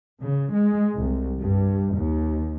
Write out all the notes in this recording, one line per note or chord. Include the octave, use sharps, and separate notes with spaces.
C#3
G#3
C2
G2
D#2